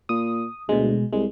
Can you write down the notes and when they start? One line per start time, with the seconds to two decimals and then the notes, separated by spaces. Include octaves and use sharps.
0.09 A#2 D#6
0.69 D2 B2 G#3
1.13 C2 G#3